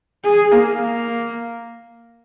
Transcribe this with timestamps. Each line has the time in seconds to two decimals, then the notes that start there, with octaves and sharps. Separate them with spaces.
0.24 G#4
0.52 A#3
0.82 A#3